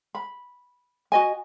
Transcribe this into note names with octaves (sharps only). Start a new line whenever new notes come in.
B5
F#4 D#5 G#5